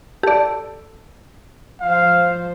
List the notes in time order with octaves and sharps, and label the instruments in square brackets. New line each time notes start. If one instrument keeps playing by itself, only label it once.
[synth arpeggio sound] G4 D5 [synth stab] A4
[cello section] F3 C5 [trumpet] F5